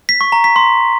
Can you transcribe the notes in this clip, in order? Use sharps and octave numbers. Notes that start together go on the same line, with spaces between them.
B6
C#6
A#5
B6
C6